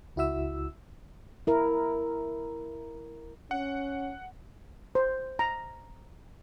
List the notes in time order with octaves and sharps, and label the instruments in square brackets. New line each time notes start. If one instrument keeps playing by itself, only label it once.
[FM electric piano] C#2 E4 F#4 E5 E6
[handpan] E4 A#4
[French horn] C#4 [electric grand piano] F#5
[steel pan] C5
A#5